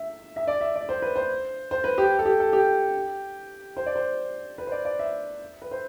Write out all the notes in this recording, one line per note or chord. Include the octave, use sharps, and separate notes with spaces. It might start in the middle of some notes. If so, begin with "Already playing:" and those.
Already playing: E5
E5
D5
E5
D5
C5
B4
C5
C5
B4
G4
A4
G4
A4
G4
C5
D5
C5
B4
C5
D5
D5
E5
B4
C5